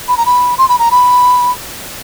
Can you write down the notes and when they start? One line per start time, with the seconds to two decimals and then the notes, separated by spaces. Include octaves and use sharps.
0.08 B5
0.17 A#5
0.26 B5
0.58 C6
0.69 B5
0.79 A#5
0.91 B5